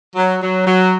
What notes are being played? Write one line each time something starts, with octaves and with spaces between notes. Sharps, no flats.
F#3
F#3
F#3